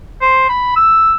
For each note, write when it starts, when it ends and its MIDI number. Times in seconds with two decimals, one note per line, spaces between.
0.21 0.48 72
0.49 0.72 83
0.76 1.17 88